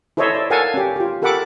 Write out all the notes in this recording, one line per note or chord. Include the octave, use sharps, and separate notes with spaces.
E4 A4 C5 C#5 D#5 E5
D5
A4 A#4 F5 F#5 G#5 A5
C#4 G4
F4 G4
G4 A4 A#4 F#5 B5 D6